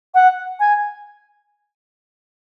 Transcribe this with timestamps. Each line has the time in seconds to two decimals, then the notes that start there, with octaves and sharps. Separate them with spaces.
0.15 F#5
0.60 G#5